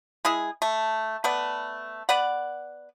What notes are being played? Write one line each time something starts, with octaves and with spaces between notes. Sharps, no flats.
G#3 E4 G#4
A3
A3 B3 B4 D5
B3 B4 D5 F#5